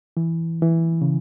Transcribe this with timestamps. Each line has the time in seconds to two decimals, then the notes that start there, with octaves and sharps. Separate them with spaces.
0.17 E3
0.62 E3
1.02 C#3